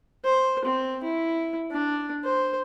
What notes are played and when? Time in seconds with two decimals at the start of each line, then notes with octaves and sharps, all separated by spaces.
0.24 C5
0.65 C4
1.03 E4
1.71 D4
2.24 C5